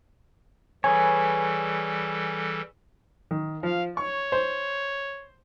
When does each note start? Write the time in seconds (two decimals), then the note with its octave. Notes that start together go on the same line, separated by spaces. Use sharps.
0.84 E3 G3 G#4 A4 B4 C#5 G#5
3.31 D#3
3.63 F3 F5
3.97 C#5 C#6
4.32 C5